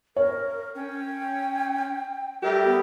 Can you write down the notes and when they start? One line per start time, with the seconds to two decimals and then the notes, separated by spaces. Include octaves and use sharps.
0.16 A#4 C#5
0.75 C#4 G5
2.42 G3 A3 G4 A#4
2.64 B3